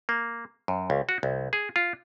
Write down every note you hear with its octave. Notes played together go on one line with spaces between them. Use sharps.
A#3
F#2
C#2
F#4
C2
G#4
F4